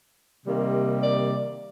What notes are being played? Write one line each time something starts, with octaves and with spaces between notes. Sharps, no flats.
C3 D#3 G3 A#3
D5